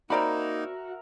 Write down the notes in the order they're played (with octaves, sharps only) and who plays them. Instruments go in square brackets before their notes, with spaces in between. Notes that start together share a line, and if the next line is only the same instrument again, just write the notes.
[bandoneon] A#3 D#4 [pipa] C4 D5 B5 [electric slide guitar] F#4 [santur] A#4 E5